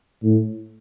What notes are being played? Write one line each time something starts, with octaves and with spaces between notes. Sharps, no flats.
A2